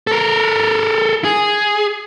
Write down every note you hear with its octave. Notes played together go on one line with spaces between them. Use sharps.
A4 A#4
G#4